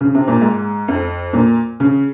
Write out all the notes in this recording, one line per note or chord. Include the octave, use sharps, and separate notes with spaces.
C#3
C3
A#2
G#2
F2
A#2
C#3